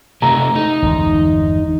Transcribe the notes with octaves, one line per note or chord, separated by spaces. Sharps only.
C3 A3 A#5
D#4
G1 E2 G#3